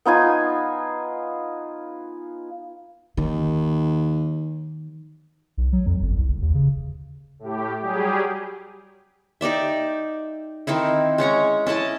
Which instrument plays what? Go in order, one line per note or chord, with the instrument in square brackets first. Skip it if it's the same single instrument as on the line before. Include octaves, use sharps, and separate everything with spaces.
[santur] B3 D#4 F4 G#5
[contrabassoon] D#2 [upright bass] D#3
[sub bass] B1
F#3
F2
G1
C2
F#1
D#2
C#3
[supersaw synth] A2 G4
F#3 G3 G4 G#4
[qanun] D#4 G4 D5 E5
D#3 C4 D#4 E4
G#3 C#4 C#5 A#5
C#4 E4 D#5 A5